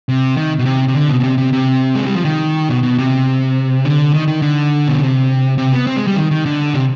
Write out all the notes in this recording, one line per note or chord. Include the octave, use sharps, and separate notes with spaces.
C3
D#3
B2
C3
C3
D3
B2
B2
C3
C3
C3
G#3
G3
F3
D#3
B2
B2
C3
D3
D#3
D#3
D3
B2
C3
C3
B3
C4
G#3
G3
D#3
D#3
D3
C3